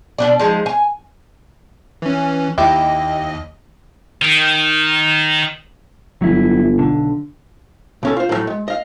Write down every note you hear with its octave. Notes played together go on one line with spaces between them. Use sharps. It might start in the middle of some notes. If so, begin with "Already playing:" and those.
B2 D4 D5
F3 G#3 D#4
G#5
E3 C#4
D#2 E4 G4 D#5
D#3
G1 F#3 E4
B1 D3
B1 C#4 A4
F4 C5
A2 C#3 F#3
G#3
D#5 F5